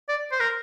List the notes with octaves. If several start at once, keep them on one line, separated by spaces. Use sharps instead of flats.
D5
C5
A#4